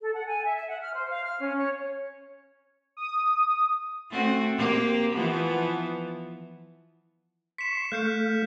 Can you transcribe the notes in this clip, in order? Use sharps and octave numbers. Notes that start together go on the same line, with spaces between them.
A4
F#5
G#5
E5
E5
F#5
F6
C5
F5
F6
C#4
C#5
D#6
A3 C4 F#4
A#3 C4 G4
E3 F3 B3
C6 C#6 B6 E7
A3 F5 F#6 G6 C#7